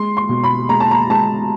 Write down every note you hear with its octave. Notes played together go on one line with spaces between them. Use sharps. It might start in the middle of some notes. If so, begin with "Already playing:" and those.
Already playing: G#3 C6
C6
B2
B5
G#3 A#5
A5
A#5
G#3 A5